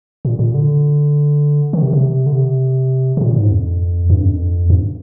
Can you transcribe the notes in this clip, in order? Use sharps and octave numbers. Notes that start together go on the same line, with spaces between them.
A#2
A#2
D3
D#3
C3
C3
D3
C3
C3
A#2
G#2
F2
G2
F2
G2